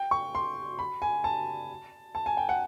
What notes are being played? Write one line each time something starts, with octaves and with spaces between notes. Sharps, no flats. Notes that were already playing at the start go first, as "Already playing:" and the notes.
Already playing: G5
C#6
C6
B5
G#5
A5
A5
G#5
G5
F#5